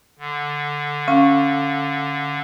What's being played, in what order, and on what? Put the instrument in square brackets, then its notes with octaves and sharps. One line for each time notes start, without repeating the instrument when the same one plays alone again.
[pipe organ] D3
[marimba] C#4 [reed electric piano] F5